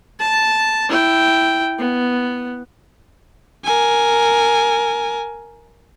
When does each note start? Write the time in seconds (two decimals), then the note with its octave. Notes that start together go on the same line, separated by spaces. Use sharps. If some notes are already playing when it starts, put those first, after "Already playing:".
0.20 A5
0.89 E4 G5
1.78 B3
3.65 A#4 G#5